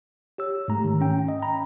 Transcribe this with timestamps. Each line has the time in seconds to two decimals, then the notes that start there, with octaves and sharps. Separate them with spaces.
0.38 G4 C#5 E6
0.68 G#2 A3 A#5
0.84 D#3
1.01 C#4 G5
1.28 D#5
1.42 A#5 B5